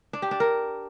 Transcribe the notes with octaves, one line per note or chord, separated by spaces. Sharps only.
D4
G4
D4
A#4